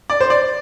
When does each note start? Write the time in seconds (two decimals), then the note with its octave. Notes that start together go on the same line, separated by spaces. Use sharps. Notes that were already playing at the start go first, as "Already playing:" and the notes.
0.10 D5
0.21 C5
0.30 D5